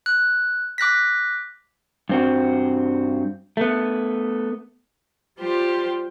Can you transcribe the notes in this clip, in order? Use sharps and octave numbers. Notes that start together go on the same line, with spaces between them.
F#6
D6 F#6 A#6 B6
G2 C4 F#4
A3 B3
G3 F4 G4 C5